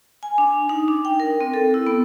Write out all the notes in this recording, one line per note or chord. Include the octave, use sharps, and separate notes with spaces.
G#5
D4
D#4
D4
G5
A#4
C4
A4
E4
B3